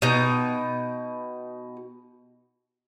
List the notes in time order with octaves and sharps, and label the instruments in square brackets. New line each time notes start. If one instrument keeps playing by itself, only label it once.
[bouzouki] B2 D#4 G5